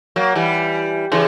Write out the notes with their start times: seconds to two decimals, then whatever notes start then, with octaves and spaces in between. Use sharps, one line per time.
0.16 F#3 A#3
0.35 E3 G3
1.12 C#3 E3